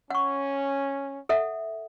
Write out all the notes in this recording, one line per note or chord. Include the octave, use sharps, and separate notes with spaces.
C#4 F#5 C#6
A4 E5 F#5